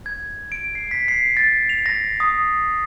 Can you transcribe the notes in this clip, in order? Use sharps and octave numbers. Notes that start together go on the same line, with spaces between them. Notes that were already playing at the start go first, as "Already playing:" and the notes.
G#6
D7
C7
B6
C7
A6
F7
A#6
D#6